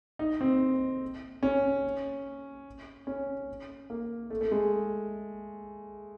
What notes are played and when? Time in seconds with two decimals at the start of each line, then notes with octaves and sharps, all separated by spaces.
0.19 D#4
0.41 C4
1.43 C#4
3.07 C#4
3.90 A#3
4.30 A3
4.41 A3
4.51 G#3